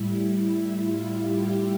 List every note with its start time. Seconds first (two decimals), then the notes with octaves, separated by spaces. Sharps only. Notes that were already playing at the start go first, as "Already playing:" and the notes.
Already playing: A2 G3 E4
0.45 E4
0.83 F4
1.20 G4